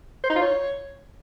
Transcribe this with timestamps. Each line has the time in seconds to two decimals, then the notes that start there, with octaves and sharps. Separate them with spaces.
0.24 C5
0.30 D#4
0.35 F4
0.41 C#5